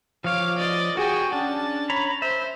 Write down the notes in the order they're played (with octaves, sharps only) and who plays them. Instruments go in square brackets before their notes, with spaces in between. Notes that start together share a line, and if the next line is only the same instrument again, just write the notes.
[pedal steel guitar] F3 C#5 [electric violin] F5 D6
[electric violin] D5 D#5
[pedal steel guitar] F#4 [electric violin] G#4 G5
[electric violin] C#4 A5 [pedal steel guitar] D4
[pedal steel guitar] C#5 A#5 B5
[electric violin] C5 [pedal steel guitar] E5